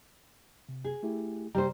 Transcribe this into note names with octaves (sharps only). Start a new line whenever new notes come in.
C3
G#4
A3 E4 G4
C3 G3 C5 A#5